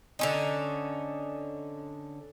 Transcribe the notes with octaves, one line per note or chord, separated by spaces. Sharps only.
D3 C#4 D#4